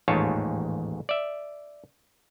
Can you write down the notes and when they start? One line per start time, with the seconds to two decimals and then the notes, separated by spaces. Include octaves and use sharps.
0.08 A1 D#2 G#2 F4 C#5 A5
1.09 D5 E5